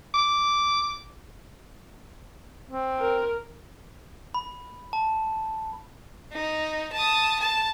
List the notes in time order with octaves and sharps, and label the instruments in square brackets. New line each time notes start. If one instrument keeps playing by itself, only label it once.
[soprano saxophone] D6
[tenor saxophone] C4
[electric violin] A#4
[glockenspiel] B5
A5
[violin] D#4
A5 D#6
A5